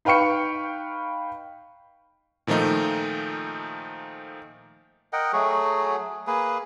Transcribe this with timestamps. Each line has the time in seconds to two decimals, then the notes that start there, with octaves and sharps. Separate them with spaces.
0.05 D#4 B4 F5 G5 C#6 C#7
2.47 A#2 D#3 F3 A3 D#4
5.13 A#4 D#5 F#5 G5
5.33 F#3 A3 F#4 G#4
6.27 A#3 G#4 B4